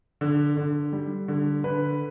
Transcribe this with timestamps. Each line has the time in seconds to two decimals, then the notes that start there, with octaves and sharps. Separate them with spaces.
0.21 D3
0.57 D3
0.93 G3
1.28 D3
1.64 D3 B4